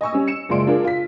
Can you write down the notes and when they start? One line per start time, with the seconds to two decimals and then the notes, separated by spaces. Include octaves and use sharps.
0.01 D#5 G#5 C#6 E6
0.12 G3 C#4
0.28 C#7 E7
0.49 F#1 G#3 F4 D5 C6 D7
0.67 D4 F4 G#4 A#4
0.84 F4 B6